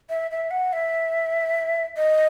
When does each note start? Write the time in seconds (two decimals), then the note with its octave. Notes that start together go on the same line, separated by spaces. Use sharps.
0.10 E5
0.31 E5
0.51 F#5
0.73 E5
1.97 D#5